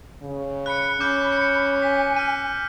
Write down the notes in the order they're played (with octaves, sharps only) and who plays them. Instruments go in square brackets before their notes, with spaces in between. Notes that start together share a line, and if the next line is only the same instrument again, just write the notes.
[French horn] C#3
[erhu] B5 [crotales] F#6 C#7
[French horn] C#4 [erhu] B5 [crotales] D6 F6 G6
[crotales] C#7
[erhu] G#5 [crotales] B6
[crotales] F6 G6 D#7